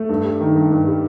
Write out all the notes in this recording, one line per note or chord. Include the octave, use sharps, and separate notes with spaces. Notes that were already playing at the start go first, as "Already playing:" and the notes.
Already playing: A3
G2
G3
D#3
G2
G2
G3